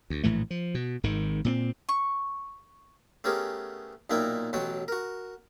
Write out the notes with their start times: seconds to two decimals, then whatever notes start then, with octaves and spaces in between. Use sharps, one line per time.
0.10 D2
0.23 A#1 A2 E3 A3
0.51 F3
0.75 B2
1.03 G#1 G#2 D#3
1.45 A#2 A#3 C4
1.89 C#6
3.24 A3 B3 C#4 G4 G#4 A#4
4.10 B1 A#2 D#4 E4 A#4 G5
4.53 A1 B2 F#3 F#4 G5
4.88 F#4 A#4